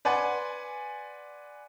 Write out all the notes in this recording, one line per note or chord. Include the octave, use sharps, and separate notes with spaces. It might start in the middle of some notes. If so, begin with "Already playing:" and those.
B4 D5 F#5 G#5 C6